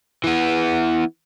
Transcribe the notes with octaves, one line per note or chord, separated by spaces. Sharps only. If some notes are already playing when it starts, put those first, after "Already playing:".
E3 B3